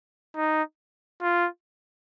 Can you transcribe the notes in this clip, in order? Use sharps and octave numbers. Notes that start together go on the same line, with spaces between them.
D#4
F4